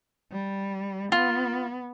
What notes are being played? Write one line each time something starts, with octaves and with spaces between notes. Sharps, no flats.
G3
B3 F4